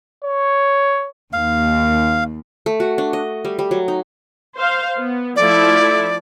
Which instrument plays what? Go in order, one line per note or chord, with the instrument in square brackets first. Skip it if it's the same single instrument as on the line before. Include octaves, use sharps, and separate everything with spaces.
[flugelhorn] C#5
[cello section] D#2 [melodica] F5
[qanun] A3
F#4
D4
D#5
G3
G3
F#3
D#4
[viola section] C5 F5
B3
[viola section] F3 A3 E4 [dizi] D5